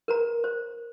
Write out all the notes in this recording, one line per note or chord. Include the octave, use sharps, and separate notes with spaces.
A#4 B4 A#5
C5